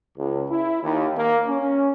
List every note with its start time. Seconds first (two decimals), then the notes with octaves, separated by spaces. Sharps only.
0.17 C#2
0.49 E4
0.82 D#2
1.16 A#3
1.47 C#4